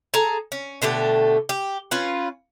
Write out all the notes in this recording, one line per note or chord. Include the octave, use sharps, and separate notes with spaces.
G#4 A4 A#5
C#4
B2 D3 A3 G4
G4
C#4 F4 B4